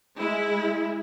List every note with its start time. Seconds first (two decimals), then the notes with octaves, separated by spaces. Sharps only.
0.18 G#3 E4